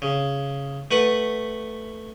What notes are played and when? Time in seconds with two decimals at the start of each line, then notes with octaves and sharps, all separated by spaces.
0.02 C#3
0.91 A3 B4 F#5 C#6